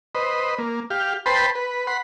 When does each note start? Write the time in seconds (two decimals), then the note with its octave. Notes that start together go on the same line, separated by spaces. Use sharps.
0.15 B4 C5 D#5
0.58 A#3
0.90 G4 F5
1.26 B4 C5 G5 A5 B5 C6
1.55 B4
1.87 F#5 B5 C6